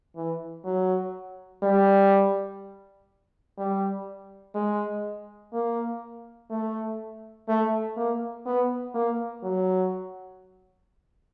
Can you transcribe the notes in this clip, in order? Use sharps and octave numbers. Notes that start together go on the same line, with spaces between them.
E3
F#3
G3
G3
G#3
A#3
A3
A3
A#3
B3
A#3
F#3